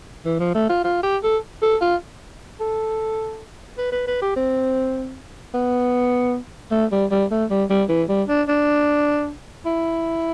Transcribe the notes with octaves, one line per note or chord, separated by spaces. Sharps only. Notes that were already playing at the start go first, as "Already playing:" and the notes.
E3
F3
A3
F4
F4
G4
A4
A4
F4
A4
B4
B4
B4
G4
C4
B3
A3
G3
G3
A3
G3
G3
E3
G3
D4
D4
E4